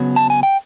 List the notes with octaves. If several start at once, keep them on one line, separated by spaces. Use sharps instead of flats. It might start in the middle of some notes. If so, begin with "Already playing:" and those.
Already playing: C#3 F#3 B3
A5
G#5
G5